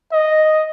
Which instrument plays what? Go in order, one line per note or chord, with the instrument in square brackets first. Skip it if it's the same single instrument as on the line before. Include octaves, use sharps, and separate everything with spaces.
[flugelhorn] D#5